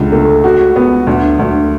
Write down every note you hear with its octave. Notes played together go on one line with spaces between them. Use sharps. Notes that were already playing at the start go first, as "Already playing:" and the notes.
Already playing: C#2 D3
A3
F#4
B3
D2
D2